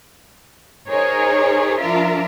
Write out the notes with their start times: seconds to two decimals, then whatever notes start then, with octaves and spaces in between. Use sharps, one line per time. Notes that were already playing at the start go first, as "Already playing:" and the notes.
0.88 D#4 G#4 A#4 C5 C#5
1.78 F3 D4 F4 A#4 E5